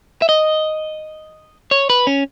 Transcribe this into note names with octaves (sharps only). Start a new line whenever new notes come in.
E5
D#5
C#5
B4
C#4